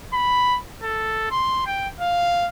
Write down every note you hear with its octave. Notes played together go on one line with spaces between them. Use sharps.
B5
A4
C6
G5
F5